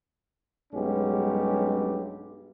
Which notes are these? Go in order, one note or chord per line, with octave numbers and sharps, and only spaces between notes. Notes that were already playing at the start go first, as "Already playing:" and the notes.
B1 G2 G#3 B3 C#4 G4